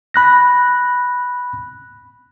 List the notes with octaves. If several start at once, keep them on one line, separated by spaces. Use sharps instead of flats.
B5 F#6 A#6